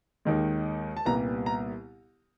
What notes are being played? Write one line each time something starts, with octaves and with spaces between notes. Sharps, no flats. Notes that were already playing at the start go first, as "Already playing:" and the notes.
D#2 D#3 G#3
A5
C2 A#2 G3 B3 A#5
A#5